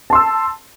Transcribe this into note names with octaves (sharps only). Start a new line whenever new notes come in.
A5 C6 E6